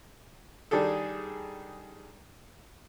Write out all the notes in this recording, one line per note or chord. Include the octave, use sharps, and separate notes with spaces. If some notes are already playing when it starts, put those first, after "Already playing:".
D#3 G3 D4 G#4 A4